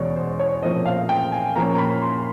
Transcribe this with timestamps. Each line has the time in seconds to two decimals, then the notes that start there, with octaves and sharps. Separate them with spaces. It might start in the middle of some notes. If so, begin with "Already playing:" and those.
Already playing: E2 B2 G#3 C#5 D5
0.16 C5
0.39 C#5
0.62 A#2 F3 A3 C4 D#5
0.86 F5
1.09 G5
1.32 G#5
1.56 A#2 F3 A#3 C#4 A#5
1.74 A#5
1.78 B5
2.02 C6